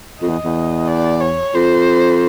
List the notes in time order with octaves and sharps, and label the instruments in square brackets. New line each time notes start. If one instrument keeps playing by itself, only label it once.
[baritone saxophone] F2 [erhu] D#5
[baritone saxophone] E2
E2
[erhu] D5
C#5
[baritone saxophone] F2 [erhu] C5